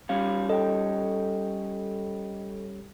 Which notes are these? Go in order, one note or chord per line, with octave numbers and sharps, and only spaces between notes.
G3 C#4 F5
A4 D#5 G5